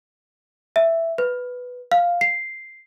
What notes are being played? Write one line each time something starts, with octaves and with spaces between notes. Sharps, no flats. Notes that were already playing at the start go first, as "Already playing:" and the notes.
E5
B4
F5
C7